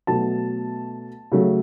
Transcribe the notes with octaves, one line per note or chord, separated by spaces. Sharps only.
B2 F#3 A3 A5
C#3 F#3 A3